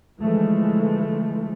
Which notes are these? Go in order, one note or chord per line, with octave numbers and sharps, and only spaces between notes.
D3 E3 F3 G#3 A3